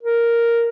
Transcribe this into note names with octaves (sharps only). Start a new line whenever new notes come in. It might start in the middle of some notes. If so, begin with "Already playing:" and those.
A#4